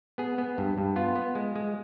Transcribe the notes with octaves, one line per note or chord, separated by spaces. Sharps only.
B3 G#4
B3
G2
G2
B3 F4
B3
G#3
G#3